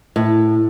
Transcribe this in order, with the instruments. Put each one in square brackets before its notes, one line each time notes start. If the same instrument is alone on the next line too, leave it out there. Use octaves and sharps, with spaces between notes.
[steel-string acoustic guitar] A2